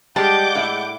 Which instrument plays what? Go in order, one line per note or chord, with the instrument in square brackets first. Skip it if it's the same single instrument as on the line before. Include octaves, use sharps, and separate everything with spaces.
[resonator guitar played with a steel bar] G3 [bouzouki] G#3 A5 [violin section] F#5 D6 G6
[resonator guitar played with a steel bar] A2 E5